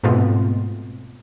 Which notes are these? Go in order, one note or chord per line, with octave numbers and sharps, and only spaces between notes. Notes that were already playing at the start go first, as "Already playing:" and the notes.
G#2 B2 A3 B3 C4 F4